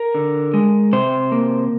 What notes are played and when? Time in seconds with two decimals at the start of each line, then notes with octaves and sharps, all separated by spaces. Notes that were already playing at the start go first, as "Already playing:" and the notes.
Already playing: A#4
0.15 D3
0.54 G#3
0.93 C3 C5
1.32 A#3